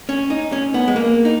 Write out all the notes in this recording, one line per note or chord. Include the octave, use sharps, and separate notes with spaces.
C#4
D#4
C#4
B3
G#3
A#3
D#4